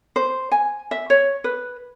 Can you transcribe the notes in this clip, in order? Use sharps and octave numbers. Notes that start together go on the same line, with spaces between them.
C5
G#5
E5
C#5
B4